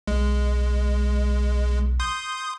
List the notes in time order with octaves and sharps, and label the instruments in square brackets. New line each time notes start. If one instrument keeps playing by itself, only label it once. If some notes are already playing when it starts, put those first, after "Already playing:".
[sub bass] B1 [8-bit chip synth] G#3
[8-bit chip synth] C6 D#6 G6